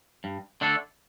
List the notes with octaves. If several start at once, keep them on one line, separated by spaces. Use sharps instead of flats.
G2
D3 A3 D4 A4